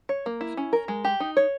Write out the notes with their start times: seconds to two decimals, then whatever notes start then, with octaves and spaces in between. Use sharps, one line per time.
0.09 C#5
0.26 A#3
0.41 E4
0.57 C#4
0.73 A#4
0.88 G#3
1.05 G4
1.20 D#4
1.37 C#5